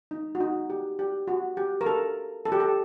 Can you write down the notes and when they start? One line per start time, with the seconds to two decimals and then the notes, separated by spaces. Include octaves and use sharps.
0.11 D#4
0.35 F#4
0.40 D#4
0.70 G4
0.99 G4
1.28 F#4
1.57 G4
1.81 A#4
1.86 A4
2.45 A4
2.52 G4
2.60 A4